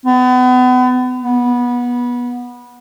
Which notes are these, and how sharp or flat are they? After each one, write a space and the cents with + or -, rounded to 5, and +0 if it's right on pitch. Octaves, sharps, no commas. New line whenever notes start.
B3 +35
B3 -20